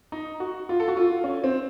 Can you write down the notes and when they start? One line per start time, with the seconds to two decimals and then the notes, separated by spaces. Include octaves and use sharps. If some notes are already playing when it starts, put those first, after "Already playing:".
0.12 D#4
0.40 F#4
0.69 F4
0.80 A4
0.88 F#4
0.97 F4
1.24 C#4
1.44 C4